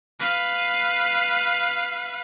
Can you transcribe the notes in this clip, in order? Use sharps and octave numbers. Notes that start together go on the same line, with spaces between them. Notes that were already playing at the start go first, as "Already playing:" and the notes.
B4 F5